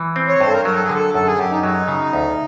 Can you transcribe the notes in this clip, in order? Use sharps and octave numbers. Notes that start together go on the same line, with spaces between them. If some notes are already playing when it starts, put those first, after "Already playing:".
Already playing: E3
C4
C#5
G2 C5
A4
A#4
F#3 A#4
A4
G#4
D3 A4
F#2 A4
G#4
F#2 G4
D#4
F#3 D#4
C#3
D2